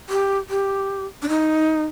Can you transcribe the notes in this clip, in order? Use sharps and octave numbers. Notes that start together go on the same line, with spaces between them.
G4
G4
D4
D#4